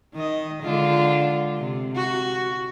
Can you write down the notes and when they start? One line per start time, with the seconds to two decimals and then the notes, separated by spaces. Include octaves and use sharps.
0.14 D#3 D#5
0.62 D3 G#3 F4
1.57 C3
1.95 F#4